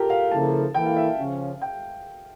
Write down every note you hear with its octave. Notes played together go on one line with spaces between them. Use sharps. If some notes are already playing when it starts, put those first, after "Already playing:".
Already playing: F4 G4 A4 A#4
F5
C#3 F3 A#3 E4 A4 A5
E3 A#3 E4 A4 G5
F5
E5
F5
C#3 F3 C#4
G5